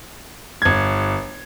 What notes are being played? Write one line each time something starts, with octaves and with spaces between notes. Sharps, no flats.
G1 G#6